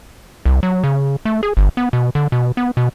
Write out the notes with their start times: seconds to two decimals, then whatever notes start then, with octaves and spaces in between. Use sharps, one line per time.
0.45 C2
0.63 F#3
0.84 C#3
1.25 A3
1.43 G#4
1.57 G1
1.77 B3
1.93 B2
2.15 D3
2.32 B2
2.57 B3
2.77 B2